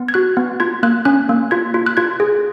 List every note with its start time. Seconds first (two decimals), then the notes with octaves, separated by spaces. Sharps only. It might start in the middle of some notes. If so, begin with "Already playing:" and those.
Already playing: B3
0.08 G#6
0.14 F#4 F#6
0.37 B3
0.60 F4 G#6
0.83 A#3 F#6
1.05 C#4 F#6
1.29 A#3
1.51 F4 G#6
1.74 F4
1.86 F#6
1.97 F4 G#6
2.20 G#4